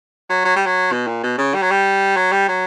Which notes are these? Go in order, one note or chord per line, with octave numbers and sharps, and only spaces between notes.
F#3
F#3
G3
F#3
B2
A#2
B2
C#3
G3
F#3
G3
F#3
G3
F#3